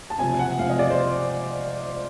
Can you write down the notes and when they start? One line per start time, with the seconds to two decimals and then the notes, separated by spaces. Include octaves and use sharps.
0.10 A5
0.18 F#1 F2 C3 G#5
0.39 F#5
0.59 F#1 F2 C3 F5
0.69 D#5
0.79 D5
0.90 C5